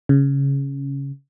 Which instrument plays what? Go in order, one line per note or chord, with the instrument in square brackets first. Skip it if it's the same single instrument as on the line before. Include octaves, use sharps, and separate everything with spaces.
[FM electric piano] C#3